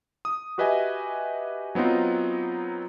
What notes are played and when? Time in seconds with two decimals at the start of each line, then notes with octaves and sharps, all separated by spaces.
0.25 D#6
0.58 F#4 G4 B4 D#5 E5 G#5
1.75 F#3 B3 C4 D#4 F4